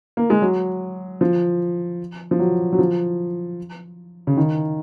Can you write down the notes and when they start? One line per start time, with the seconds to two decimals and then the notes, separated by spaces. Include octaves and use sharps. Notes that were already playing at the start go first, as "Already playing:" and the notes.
0.17 A#3
0.30 G#3
0.42 F#3
1.21 F3
2.31 F3
2.39 F#3
2.73 F#3
2.79 F3
4.27 C#3
4.37 D#3